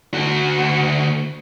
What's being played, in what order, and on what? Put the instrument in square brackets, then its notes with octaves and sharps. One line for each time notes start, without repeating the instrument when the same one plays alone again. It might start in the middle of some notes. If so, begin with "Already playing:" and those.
[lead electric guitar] D2 F#4